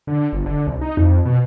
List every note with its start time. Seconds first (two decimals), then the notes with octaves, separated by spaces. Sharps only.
0.07 D3
0.33 G1
0.46 D3
0.67 C2
0.81 D#4
0.97 F2
1.25 B2